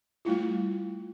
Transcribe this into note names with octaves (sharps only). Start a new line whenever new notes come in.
G3 A3 E4 F4